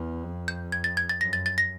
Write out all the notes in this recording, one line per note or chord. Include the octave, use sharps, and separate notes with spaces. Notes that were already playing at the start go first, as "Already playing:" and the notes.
Already playing: E2
F2
G6
G#6
A6
G#6
A6
F#2 A#6
A6
A6
A#6